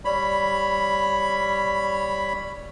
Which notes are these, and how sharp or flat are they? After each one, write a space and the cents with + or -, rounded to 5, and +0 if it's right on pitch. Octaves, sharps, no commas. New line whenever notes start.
G3 +0 C#5 +0 B5 +5